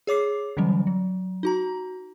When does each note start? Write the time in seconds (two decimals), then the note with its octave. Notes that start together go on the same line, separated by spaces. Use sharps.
0.07 G#4 C#5 D6 C7
0.57 D3 E3 F#3 G3 C#4
0.87 F#3
1.43 D#4 F#4 A#5